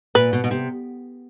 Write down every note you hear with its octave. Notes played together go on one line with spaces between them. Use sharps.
A#2 B4
B2
B2
C3